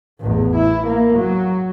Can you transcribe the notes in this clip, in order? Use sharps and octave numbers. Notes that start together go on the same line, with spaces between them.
A1 E2
E4
A#3
F#3